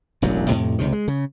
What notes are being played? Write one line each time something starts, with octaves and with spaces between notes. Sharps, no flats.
E1 A1 F#2 F#3
F2 A2 C3
C#2 C3 D#3
G#3
C#3